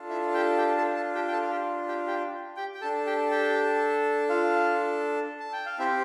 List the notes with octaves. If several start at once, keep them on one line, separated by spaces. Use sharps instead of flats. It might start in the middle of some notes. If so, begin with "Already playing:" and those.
Already playing: D4 F4 A4
E4 E5
G4 G5
G4 G5
A4 A5
A4 A5
G4 G5
G5
A4 A5
F5
G4 G5
G4 G5
G4 G5
G4 G5
G5
D4 A4 A5
G4 G5
G4 G5
F4 F5
A5
G5
F5
C4 E4 G4 E5